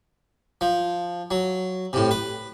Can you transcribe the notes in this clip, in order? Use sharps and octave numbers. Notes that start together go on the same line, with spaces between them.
F3
F#3
A2 C3
B4